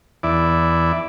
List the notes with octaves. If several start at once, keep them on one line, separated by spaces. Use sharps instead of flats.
E2 E4 D5